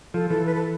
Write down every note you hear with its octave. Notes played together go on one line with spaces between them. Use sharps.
F3 A4
E3 A4
B4
A4